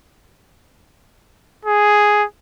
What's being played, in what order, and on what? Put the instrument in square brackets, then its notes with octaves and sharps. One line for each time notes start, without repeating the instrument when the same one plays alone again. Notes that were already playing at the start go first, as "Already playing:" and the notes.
[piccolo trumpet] G#4